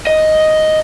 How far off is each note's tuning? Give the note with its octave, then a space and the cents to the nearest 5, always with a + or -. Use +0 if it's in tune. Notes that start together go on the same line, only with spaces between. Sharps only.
D#5 +5